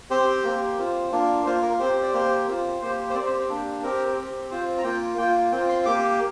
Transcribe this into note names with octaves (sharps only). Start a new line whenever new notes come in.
C4 G4 C5
A#3 G4
C4 F4
A#3 D4 F4
A#3 F4 C5
A#4
C4 G4 C5
D5
A#3 G4 C5
C4 F4
A#3 G4 C5
C5
C4 G4 D5
C5
A#3 D4 G4
C4 G4 A#4
C4 G4
C4 F4 C5
A#5
A#3 F4 G5
A#3 F4 G5
C4 F4 G5
C6
A#3 G4 D6